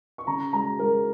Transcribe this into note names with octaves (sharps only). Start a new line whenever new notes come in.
C#6
C#3 A#5
G#3 A#5
G#3 A#4